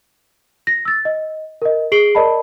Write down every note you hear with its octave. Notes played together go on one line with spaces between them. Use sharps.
A#6
E6 A6
D#5
A#4 D#5
G#4 C7 D7 F#7 G7
A#4 D5 D#5 A5 B5